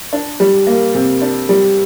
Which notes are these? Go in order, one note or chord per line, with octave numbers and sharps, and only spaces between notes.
D4
G3
A#3
C3
D4
G3